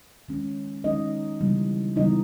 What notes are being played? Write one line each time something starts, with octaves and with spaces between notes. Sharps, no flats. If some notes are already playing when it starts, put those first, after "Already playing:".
D#3 G#3 C#4
D#3 G#3 C#4 D#4 D#5
C#3 E3 G3 B3
C#3 E3 G3 B3 D#4 D#5